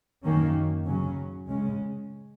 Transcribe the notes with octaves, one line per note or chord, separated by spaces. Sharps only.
F#2 D#3 A#3 C#4
C#3 F#3 C#4
C#3 G#3 C#4